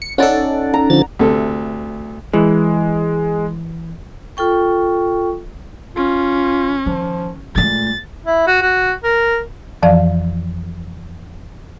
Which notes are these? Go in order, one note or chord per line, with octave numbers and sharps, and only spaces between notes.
C#7
C#4 D#4 A4 D5 F#5
A#5
D3 F3 A6
D2 C3 A3 A4
E3 G#3
F4 A4 G5 C#6
C#4 F4
D#3 F3
A#2 G#3 A3 A6
E4
F#4
F#4
A#4
F2 E3 F3 D5 F5